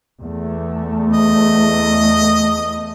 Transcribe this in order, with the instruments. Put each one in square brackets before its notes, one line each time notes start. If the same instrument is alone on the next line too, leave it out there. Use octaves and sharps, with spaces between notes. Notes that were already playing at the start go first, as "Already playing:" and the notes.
[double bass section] E2 A3
[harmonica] D#5